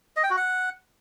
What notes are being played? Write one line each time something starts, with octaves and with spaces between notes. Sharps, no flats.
D#5
G5
F#4
F#5